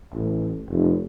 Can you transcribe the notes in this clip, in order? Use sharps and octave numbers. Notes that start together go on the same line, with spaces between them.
A1
F1